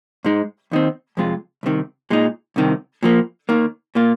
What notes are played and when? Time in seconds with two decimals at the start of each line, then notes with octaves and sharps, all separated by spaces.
0.24 G#2 G#3 D#4
0.71 D#2 D#3 C4
1.17 F2 C3 G#3 F4
1.63 C2 C3 D#3
2.10 A#2 G#3 D#4
2.56 C2 C3 D#3
3.03 A#2 F3 A#3
3.49 D#2 D#3 A#3
3.95 A#2 A#3 F4